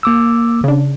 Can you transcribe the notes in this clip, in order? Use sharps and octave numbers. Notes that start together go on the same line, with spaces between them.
A#3 D6 E6
C#3 D4